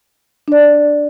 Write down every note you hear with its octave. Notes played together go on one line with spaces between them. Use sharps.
D4 D5